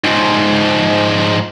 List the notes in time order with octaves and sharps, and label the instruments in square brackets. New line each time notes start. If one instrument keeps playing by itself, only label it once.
[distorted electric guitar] G#2 F3